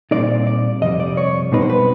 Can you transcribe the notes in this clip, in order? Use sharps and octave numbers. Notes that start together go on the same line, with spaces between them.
A#2 G3 C4 D#4 D5
D5
F2 C3 G3 D#5
D5
C#5
B2 G3 C4 D#4 B4
C5
B4